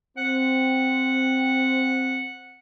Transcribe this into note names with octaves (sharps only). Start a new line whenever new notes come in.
C4 F#5